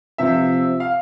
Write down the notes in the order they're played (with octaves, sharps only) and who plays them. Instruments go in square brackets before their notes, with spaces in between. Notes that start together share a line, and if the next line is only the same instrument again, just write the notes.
[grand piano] C3 F3 C4 E5
F5